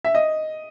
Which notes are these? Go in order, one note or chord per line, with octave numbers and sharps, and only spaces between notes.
E5
D#5